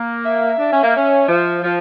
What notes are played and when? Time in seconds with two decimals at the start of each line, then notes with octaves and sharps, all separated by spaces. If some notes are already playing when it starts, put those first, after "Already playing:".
Already playing: A#3
0.24 E5
0.58 D4
0.71 C#4
0.83 A#3
0.95 C#4
1.28 F3
1.63 F3